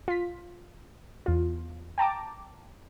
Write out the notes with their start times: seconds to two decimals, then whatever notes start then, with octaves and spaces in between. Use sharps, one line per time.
0.08 F4 B6
1.26 E2 F4
1.98 G5 A5 A#5 D6